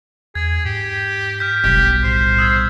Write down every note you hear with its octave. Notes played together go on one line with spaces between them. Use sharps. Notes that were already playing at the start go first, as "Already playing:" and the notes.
E2 G#4 G#6
G#2 G4
F6 G6 B6
F1 B1 G3 G4 G6
A2 C5
D#6 E6 G#6